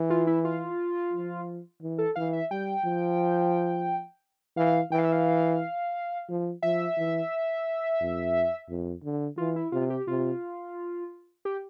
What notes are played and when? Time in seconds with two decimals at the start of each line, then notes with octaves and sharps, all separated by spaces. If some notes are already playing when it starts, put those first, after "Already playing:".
Already playing: E3
0.10 F4
0.27 E4
0.45 F4
1.13 F3
1.82 E3
1.98 A4
2.16 E3 F5
2.33 E5
2.51 G3 G5
2.85 F3
4.57 E3 F5
4.91 E3 G5
4.99 F5
5.05 E5
5.12 F5
6.29 F3
6.63 F3 E5
6.97 E3
8.01 F2
8.69 F2
9.04 D3
9.38 E3 F4
9.56 E4
9.72 C3 F4
9.90 G4
10.08 C3 F4
11.45 G4